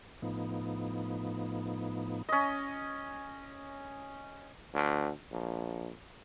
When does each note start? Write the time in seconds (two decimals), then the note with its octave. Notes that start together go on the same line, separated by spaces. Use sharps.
0.22 A2 F3 B3 D#4
2.29 C#4 D#5
4.74 D2
5.32 A#1